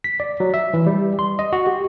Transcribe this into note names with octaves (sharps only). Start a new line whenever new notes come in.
B6
D5
F#3
E5
E3
G3
C6
D#5
F#4
G4